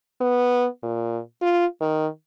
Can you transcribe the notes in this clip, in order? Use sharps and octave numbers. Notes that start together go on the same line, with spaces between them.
B3
A#2
F4
D#3